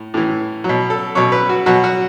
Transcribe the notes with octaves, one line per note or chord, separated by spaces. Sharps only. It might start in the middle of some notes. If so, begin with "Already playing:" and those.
Already playing: A2
A2 E3
B2 F#3
A4
B2 F#3 C#5
B4
F#4
B2 F#3 F#4
F#4